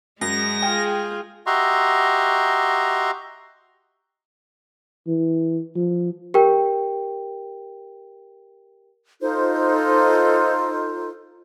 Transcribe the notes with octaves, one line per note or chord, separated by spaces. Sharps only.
F#2 G#3 A#6
F4 G#4 G5 G#5
F#4 G4 D#5 E5 A#5 C6
E3
F3
G4 A#4 G5
D#4 F4 A4 C5